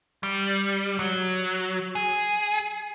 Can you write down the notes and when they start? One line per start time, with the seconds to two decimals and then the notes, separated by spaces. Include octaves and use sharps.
0.23 G3
0.99 F#3
1.95 G#4